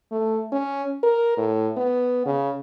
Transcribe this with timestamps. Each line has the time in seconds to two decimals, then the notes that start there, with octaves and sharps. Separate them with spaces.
0.12 A3
0.52 C#4
1.03 A#4
1.37 A2
1.77 B3
2.26 C#3